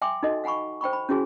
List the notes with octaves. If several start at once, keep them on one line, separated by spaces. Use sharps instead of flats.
E5 G5 G#5 C6 D6
D#4 F#4 A4 D#5
F5 F#5 G#5 B5 C#6
C5 G5 B5 C#6
B5
C#4 E4 F#4 G#4 G#5